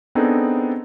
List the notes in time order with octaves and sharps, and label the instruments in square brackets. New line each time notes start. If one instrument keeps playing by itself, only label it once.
[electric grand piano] B3 C4 D4 D#4 G#4 A4